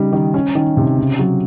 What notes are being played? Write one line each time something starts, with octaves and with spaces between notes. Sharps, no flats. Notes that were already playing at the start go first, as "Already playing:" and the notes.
Already playing: C#3 G3 D#4
D#3
C#4
D#3
C3
C#3
F#3